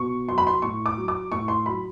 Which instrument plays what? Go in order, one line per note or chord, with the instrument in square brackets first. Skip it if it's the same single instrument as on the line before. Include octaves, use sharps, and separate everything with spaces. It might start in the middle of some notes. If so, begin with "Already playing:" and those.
Already playing: [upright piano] B2 C#6
F#3 C6
B5
C6
A2 C#6
D6
F#3
D6
A2 C#6
C6
F#3 B5